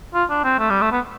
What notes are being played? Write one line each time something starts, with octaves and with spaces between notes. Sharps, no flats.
F4
D4
C4
A3
G3
A3
B3